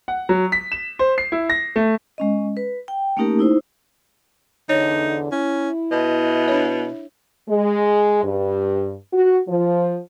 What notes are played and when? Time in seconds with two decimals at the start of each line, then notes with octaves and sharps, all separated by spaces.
0.08 F#5
0.29 F#3
0.52 B6
0.72 E7
0.99 C5
1.18 C7
1.32 E4
1.50 A#6
1.76 A3
2.18 G#3 C#4 D#5
2.57 B4
2.88 G5
3.17 A3 A#3 C#4 D#4 G4 A#4
3.39 D#4 E4 C5
4.69 E2 D3 D#4 C#5
5.32 C#4 E4
5.92 B2 D#5
6.48 D4 C#5
7.49 G#3
8.24 G2
9.13 F#4
9.48 F3